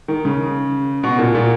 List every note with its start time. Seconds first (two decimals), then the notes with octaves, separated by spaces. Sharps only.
0.08 D#3
0.25 C#3
1.03 B2
1.18 A#2
1.35 A#2